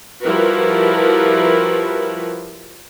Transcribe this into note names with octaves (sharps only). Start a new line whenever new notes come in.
F3 G3 E4 F#4 A#4 B4